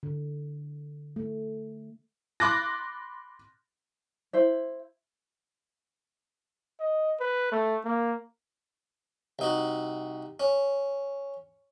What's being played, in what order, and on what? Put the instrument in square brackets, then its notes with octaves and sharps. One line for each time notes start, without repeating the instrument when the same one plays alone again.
[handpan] D3
A3
[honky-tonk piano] B5 C6 D6 F#6 A6 A#6
[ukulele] E4 C5 E5
[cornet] D#5
B4
A3
A#3
[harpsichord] C2 D#4 F#4
C#4